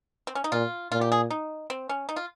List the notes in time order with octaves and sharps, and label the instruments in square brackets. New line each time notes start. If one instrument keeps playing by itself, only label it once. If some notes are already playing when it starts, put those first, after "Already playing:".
[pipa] C4
C#4
D#4
[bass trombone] A#2 [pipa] F4
[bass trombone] A#2 [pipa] F4
[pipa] G4
G#4
D#4
C4
C#4
D#4
F4